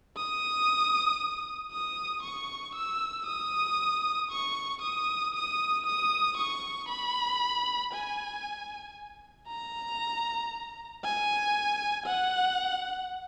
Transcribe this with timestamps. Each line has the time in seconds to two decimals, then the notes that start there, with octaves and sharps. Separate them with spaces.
0.17 D#6
1.72 D#6
2.23 C#6
2.75 E6
3.26 D#6
4.31 C#6
4.82 D#6
5.35 D#6
5.86 D#6
6.37 C#6
6.89 B5
7.93 G#5
9.48 A#5
11.04 G#5
12.07 F#5